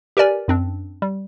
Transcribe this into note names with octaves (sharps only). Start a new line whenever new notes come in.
G4 A#4 B4 D5 G#5
F#2 C4 D4
G3